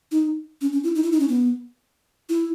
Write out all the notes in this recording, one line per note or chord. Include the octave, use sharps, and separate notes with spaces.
D#4
C#4
C#4
E4
D#4
E4
D#4
C#4
B3
E4